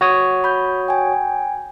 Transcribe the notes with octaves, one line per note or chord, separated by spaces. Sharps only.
F#4 C#5 D#6
B5 G6
G5 G#5